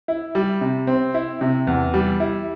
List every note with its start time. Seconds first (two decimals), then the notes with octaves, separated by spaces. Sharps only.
0.08 E4
0.35 G3
0.61 C3
0.87 C4
1.14 E4
1.41 C3
1.67 E2
1.94 G3
2.20 E4